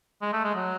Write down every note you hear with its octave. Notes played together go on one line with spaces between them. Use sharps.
G#3
A3
G#3
F#3